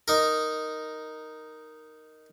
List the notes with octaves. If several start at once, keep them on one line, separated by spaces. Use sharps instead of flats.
D#4 A#4